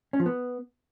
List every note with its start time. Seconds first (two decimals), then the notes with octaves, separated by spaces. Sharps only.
0.13 C#4
0.20 F3
0.26 B3